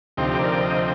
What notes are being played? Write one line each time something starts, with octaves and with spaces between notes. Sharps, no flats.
D2 C3 F3 C4 D#4 G4
A#4 D5
D#5 G5